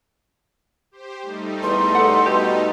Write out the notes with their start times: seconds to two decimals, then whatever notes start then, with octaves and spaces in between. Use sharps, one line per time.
0.91 G4 C5
1.22 G3 A3 D#4
1.63 E2 C6
1.95 A4 F#5
2.26 B2 G4